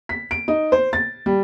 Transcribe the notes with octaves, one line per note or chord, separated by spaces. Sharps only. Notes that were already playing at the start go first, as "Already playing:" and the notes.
B6
D7
D#4
C5
A6
G3